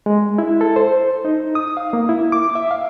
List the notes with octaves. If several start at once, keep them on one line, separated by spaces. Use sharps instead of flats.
G#3
E4
A4
C5
D#4
D#6
F5
A#3
E4
D6
E5
F5